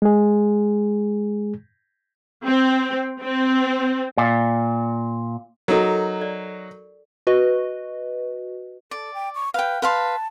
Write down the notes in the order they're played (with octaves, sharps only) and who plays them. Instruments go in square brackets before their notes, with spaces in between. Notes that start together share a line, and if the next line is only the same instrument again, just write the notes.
[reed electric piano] G#3 G#4
[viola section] C4
C4
[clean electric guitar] A#2
[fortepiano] F#3 D#4 [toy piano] A4 A#4
[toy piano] D5
[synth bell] F#4 B4 D#5
[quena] A4 [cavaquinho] D5
[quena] G5
C#6
[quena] B4 [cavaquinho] F5 G5
[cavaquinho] B4 F5 C6 [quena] A5